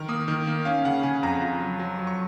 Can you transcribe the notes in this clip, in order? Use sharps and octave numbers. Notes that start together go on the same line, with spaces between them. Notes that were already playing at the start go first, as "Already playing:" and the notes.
Already playing: D#3 F6
A#3 D#6
D#3
A#3
C#4 F5
C#3 F#5
C#3 G#5
F2 A#5
F4
F#3
F#3
F#3
C#6